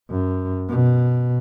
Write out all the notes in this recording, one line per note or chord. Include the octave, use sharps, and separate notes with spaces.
F#2
B2